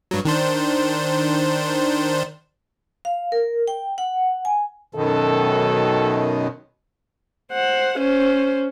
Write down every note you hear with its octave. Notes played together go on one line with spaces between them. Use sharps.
G2 F#3
D#3 D4 C5
F5
A#4
G5
F#5
G#5
F#2 B2 D#3 A4
C5 F#5
C#4 C5